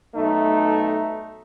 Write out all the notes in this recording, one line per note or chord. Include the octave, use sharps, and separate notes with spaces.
B1 A3 D#4